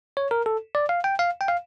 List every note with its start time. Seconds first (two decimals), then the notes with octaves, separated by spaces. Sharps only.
0.17 C#5
0.31 A#4
0.46 A4
0.75 D5
0.89 F5
1.04 G5
1.19 F5
1.41 G5
1.48 F5